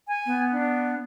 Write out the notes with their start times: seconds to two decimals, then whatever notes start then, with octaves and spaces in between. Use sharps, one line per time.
0.08 G#5
0.26 B3
0.52 D4